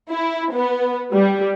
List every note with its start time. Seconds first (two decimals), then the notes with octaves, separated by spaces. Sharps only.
0.10 E4
0.52 B3
1.13 G3